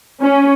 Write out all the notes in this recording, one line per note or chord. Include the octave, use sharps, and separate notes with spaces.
C#4